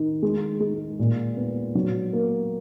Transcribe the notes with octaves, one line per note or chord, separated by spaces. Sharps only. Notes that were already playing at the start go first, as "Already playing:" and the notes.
Already playing: D#3
G#3
G#3
A#2
B3
F#3
A#3